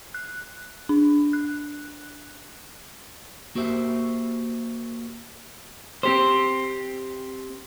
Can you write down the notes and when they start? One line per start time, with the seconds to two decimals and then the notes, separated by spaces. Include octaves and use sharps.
0.14 F#6
0.89 D4
1.33 F#6
3.55 A#3 F#4 G4 C5 E5
6.03 C4 G4 C5